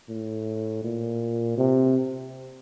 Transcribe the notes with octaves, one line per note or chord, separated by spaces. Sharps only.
A2
A#2
C3